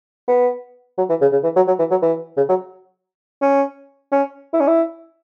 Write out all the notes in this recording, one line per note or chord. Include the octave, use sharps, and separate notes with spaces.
B3
F#3
E3
C#3
C#3
E3
F#3
F#3
E3
F#3
E3
C#3
F#3
C#4
C#4
E4
C#4
E4